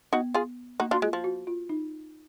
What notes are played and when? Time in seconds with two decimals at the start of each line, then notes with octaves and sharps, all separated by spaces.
0.13 B3 D#4 F#4
0.34 F4 G#4
0.80 A#3 D#4 F#4
0.91 D4 F4 F#4
1.02 G#3 F4
1.13 F3
1.24 F#4
1.47 F4
1.69 D#4